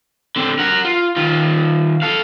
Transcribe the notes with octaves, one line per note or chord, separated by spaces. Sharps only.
D3 C4
A#4 F#5
F4
D#3 F4
A4 F5